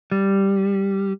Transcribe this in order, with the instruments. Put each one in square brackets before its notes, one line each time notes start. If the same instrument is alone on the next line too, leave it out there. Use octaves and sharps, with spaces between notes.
[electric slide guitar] G3